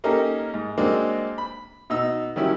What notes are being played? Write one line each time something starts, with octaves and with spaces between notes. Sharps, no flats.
A#3 C#4 D#4 G4 A4 A#4
G#2
F#3 G#3 A#3 C4 D4
B5
B2 D#4 E6
D#3 F#3 G3 C#4 E4